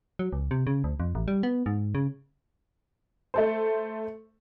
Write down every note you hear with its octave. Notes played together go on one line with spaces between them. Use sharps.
F#3
C#2
C3
C#3
D2
F2
A1
G3
B3
G#2
C#3
A3 A4 C5